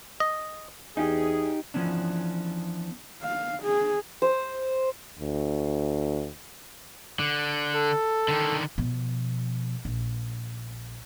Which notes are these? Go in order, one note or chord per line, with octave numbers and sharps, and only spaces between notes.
D#5
E2 D#4 G4 G#4
E3 F3 B3 C#4 D4
F5
G#4
C5
D2
D3
A4
D3 D#3
B2 F3
A#1